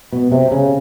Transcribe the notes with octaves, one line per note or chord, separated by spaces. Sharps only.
B2
C3
C#3